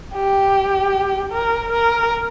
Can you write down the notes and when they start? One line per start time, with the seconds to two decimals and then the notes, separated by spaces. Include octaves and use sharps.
0.14 G4
1.32 A#4
1.72 A#4